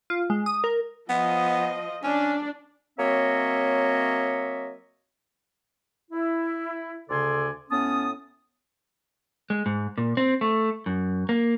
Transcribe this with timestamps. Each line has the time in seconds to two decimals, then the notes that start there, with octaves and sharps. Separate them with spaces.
0.10 F4
0.30 G#3
0.46 D#6
0.64 A#4
1.10 F3 B3 D#5
2.04 C#4 D4
2.99 F#3 A#3 C4 C#5 D#5 E5
6.11 E4
7.10 D2 C#3 A4 D5 G#5 C6
7.71 A2 B3 C#4 A5 D#6
9.50 G#3
9.66 G#2
9.98 A#2
10.17 C4
10.41 A3
10.86 F#2
11.29 A#3